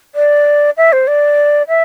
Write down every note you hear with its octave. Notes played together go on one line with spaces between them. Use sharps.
D5
E5
C5
D5
E5